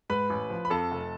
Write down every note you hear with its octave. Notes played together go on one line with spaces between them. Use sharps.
G#2 B4 B5
A1
F3
B5
F2 A4 A5
F1